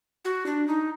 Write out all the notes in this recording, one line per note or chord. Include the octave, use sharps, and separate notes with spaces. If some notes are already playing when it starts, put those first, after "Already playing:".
F#4
D4
D#4